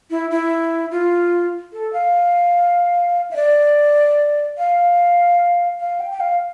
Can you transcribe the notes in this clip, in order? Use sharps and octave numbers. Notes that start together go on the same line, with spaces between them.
E4
E4
F4
A4
F5
E5
D5
F5
F5
G5
G5
F5